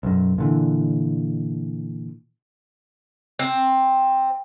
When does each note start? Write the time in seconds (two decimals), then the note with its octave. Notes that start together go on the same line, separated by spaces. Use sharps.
0.03 B1 F#2
0.38 A#2 D3 E3
3.39 C4